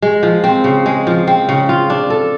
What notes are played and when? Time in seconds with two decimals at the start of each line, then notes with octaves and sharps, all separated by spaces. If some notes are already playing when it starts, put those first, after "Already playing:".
0.02 G#3
0.23 F3
0.44 C4
0.64 C#3
0.86 G#3
1.07 F3
1.27 C4
1.49 C#3
1.69 F4
1.90 D4
2.10 A4